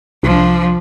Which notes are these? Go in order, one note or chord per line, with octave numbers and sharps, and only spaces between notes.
C2 F3 D4